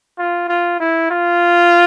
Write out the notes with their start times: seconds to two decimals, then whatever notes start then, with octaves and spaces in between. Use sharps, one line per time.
0.18 F4
0.49 F4
0.80 E4
1.10 F4